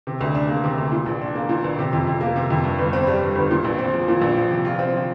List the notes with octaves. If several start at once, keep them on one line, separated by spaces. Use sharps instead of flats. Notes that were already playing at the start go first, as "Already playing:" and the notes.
C3
D2
D4
A#3
C3
D2
A#2
A#1
D4
A#3
A#2
A#1
C3
F2
F2
A#3
C3
F2
G2
G1
C4
G3
G2
G1
A#2
A#1
C4
F3
A#2
A#1
F3
C3
F4
C4
F3